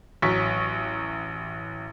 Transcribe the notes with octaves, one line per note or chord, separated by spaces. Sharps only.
A1 F#3 C#6 B6